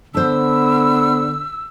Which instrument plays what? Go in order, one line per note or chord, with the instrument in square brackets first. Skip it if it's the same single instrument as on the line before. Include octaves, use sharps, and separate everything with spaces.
[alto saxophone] D3 [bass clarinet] B3 [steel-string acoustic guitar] C5 A5 [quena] E6